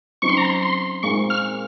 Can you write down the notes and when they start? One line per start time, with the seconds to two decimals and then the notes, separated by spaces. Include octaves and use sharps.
0.22 C#3 F#3 C4 D#4 C#6
0.29 C6
0.37 A#5
0.45 C6
0.63 C6
1.03 A#2 G#3 C4 D#4 C#6
1.30 F6